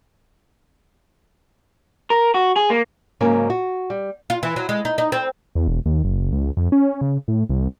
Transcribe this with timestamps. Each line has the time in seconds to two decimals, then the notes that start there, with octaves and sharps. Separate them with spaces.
2.10 A#4
2.34 F#4
2.56 G#4
2.70 A#3
3.21 G#2 C#3 F#3 A#3 C#4
3.50 F#4
3.90 G3
4.30 F4
4.43 E3
4.56 F#3
4.69 G#3
4.85 D#4
4.98 D#4
5.12 C4
5.55 E2
5.68 E1
5.86 D#2
6.04 F#1
6.32 C#2
6.57 F2
6.72 C#4
7.01 C#3
7.28 A2
7.50 C2